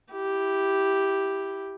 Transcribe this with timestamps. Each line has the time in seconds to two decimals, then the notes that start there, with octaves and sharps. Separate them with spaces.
0.12 E4 G4